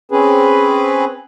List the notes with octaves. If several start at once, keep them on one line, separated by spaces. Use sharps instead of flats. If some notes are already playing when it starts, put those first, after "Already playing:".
C4 C#4 G#4 B4